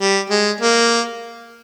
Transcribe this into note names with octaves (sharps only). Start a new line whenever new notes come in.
G3
G#3
A#3